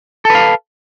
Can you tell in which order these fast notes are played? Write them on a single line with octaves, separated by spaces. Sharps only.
A4 B4 F5